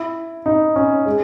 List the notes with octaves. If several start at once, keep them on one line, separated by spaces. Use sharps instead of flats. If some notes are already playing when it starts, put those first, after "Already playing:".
Already playing: E4
D#4
C#4
G#3